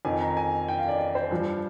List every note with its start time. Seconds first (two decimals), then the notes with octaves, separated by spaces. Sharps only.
0.05 F2 D#3 G#5
0.21 A#5
0.37 G#5
0.68 G5
0.78 F5
0.88 D5
0.99 D5
1.15 C5
1.31 G2 F3